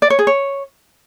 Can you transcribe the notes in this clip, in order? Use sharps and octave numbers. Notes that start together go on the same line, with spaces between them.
D5
C#5
G#4
C#5